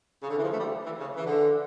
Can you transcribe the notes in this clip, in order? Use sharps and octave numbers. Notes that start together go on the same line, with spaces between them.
C#3
D3
E3
F3
A3
G3
E3
C#3
E3
D3